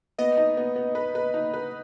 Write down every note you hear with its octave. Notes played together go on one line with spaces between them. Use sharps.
B3 D#5
D#4
B3
B3
B4
B4
D#4
B4